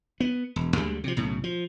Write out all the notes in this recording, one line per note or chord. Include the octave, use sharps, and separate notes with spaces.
B3
E1
D2 D3 G3 G#3
C3 F3
B1 A2 C#3
F3